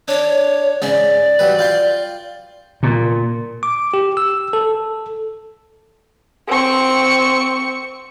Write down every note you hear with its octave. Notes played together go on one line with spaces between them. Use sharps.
D4 C#5
G#2 C#3 D5
F#3 G3 B4
F4 G5 C6
A#2
D6
G4
E6
A4
C4 C#6